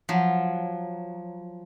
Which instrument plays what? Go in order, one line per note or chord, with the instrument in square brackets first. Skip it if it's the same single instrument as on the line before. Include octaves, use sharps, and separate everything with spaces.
[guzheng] F3 F#3